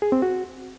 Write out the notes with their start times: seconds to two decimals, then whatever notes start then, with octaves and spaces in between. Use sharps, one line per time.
0.02 G#4
0.12 C4
0.22 F#4